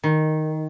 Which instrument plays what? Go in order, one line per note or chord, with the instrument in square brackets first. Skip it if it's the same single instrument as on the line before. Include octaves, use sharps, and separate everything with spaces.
[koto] D#3